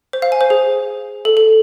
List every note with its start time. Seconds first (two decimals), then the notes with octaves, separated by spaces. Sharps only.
0.13 C5
0.22 F5
0.32 G#5
0.41 C5
0.50 G#4
1.25 A4
1.37 A4